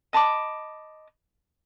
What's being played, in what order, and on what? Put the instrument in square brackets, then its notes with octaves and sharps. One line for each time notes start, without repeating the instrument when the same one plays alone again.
[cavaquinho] D#5 A5 B5 D6